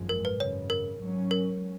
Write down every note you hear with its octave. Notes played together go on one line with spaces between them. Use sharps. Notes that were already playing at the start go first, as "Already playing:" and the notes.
Already playing: G#1 F#2 F3 G#3
A#4
B4
G#1 F#2 C#3 C#5
A#4
G#2 F#3 C#4
A#4